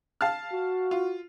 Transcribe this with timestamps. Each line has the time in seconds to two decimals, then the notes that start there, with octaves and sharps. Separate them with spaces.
0.21 F5 A5 F6
0.53 F#4
0.91 F4